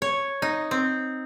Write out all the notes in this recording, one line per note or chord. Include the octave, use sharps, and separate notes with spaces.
C#5
D#4
C4